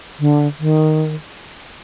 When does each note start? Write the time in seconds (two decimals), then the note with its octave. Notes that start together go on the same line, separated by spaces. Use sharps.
0.20 D3
0.60 D#3